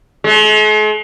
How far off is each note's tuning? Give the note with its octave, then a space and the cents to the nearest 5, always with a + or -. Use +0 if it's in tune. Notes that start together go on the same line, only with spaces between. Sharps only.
G#3 +45